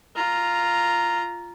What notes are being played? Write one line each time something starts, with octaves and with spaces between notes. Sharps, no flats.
F4 A#5